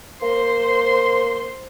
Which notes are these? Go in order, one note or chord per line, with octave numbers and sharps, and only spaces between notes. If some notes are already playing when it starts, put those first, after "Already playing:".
A#3 C5 C6